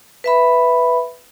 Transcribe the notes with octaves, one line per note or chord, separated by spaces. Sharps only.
B4 E5 B5